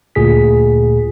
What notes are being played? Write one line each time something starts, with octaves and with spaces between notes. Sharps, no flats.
D2 A#2 G#4 B6